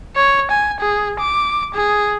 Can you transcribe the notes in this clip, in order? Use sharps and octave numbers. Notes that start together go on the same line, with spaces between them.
C#5
G#5
G#4
D6
G#4